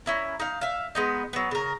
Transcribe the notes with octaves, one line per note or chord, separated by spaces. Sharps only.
C#4 E4 A#4
D#4 F5
E5 F5
G#3 B3 D#4
F#3 B3
C#3 A#4